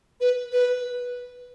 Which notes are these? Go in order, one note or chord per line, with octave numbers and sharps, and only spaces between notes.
B4
B4